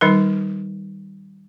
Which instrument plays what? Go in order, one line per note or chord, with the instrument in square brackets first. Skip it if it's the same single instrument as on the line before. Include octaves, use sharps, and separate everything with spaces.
[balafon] D#3 G3 D#4 A#4